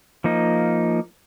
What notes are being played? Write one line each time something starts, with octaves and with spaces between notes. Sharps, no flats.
F3 A#3 D#4